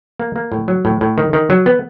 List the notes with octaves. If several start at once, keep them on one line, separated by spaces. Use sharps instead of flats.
A#3
A#3
A2
F#3
A2
A2
D#3
D#3
F#3
B3